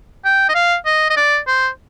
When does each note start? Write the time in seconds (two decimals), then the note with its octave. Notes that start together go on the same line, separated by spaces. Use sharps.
0.25 G5
0.49 D#5
0.54 F5
0.86 D#5
1.10 D#5
1.16 D5
1.47 C5